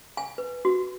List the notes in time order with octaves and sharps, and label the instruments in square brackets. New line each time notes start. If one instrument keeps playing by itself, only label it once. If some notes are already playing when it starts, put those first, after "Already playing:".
[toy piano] G#5
B4
F#4